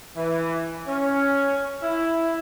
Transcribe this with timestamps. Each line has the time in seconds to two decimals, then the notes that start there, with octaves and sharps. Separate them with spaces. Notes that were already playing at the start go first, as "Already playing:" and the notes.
0.16 E3
0.88 C#4
1.82 E4